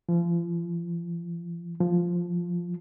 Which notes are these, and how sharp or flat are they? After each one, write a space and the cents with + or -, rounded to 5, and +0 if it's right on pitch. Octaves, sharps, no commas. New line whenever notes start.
F3 -35
F3 +0